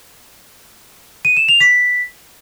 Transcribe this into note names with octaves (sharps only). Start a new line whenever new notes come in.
D#7
E7
F7
B6